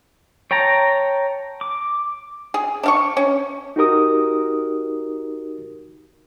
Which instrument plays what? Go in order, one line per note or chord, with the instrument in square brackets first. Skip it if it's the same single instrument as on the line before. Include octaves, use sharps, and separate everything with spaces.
[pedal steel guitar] C#5 G5 A5 A#5
D6
[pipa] G#4
D4 F5 C#6
C#4
[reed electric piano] D#4 F#4 G4 A#4 D#6